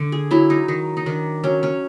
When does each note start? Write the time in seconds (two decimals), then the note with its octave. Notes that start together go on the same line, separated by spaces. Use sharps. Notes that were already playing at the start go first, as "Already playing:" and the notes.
Already playing: D3
0.12 G#4
0.31 F#3 E4
0.50 D#4
0.68 D#3 D#4
0.97 D#4
1.06 D#3 D4
1.44 F#3 C#4
1.63 C#4